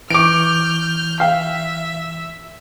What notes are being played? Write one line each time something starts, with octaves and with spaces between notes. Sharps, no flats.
E3 C#6 D6 F6 G6 D7
E5 F5 G5